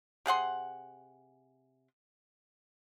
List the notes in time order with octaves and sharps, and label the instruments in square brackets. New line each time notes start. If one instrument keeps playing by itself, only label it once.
[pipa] C3 G#4 F#5 C6